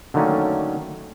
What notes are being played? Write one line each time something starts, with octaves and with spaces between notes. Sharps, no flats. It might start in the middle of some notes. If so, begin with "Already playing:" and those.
D3 D#3 F#3 A3 A#3 C#4